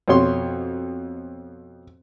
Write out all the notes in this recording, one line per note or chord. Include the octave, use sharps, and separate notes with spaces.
F2 B2 C#5 C6